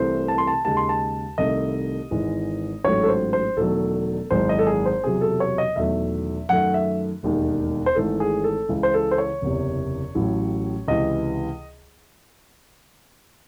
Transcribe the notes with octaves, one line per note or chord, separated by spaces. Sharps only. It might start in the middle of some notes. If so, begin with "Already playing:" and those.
Already playing: C2 C3 E3 A3 C5
A5
C6
A5
D#2 C#3 G#3 A5
C6
A5
C2 C3 D#3 A3 D#5
G#1 G#2 E3 G#3
A1 G#2 F#3 A3 C#5
A4
C5
C5
E1 E2 D#3 F#3 A3 A4
G#1 F#2 E3 G#3 C5
D#5
A4
G#4
C5
E1 E2 C3 F#3 G#4
A4
C#5
D#5
E1 E2 D#3 F#3 A3 E5
F#2 D#3 A3 F#5
E5
E1 D#2 D#3 G#3
C5
G#1 G#2 E3 A3 A4
G#4
A4
C#2 C#3 E3 G#3
C5
A4
C5
C#5
F#1 E2 C3
A1 A2 F#3
C#2 C3 E3 D#5